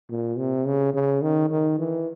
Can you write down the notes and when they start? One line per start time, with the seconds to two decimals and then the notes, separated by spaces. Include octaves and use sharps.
0.10 A#2
0.38 C3
0.66 C#3
0.94 C#3
1.22 D#3
1.50 D#3
1.79 E3